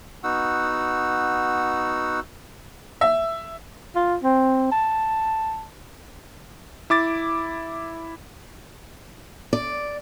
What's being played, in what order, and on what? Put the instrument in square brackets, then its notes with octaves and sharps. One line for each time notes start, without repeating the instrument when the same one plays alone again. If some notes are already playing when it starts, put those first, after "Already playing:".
[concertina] B3 D#4 F#4 F#5 E6
[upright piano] E5
[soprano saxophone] F4
C4
A5
[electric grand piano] E4 D6 A6
[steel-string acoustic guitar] D5